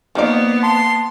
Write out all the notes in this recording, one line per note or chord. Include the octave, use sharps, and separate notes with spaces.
F3 A#3 B3 D#4 D5
A5 C6